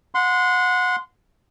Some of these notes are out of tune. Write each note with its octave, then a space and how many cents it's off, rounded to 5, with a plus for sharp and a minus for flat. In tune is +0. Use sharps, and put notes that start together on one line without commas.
F#5 -25 C6 -15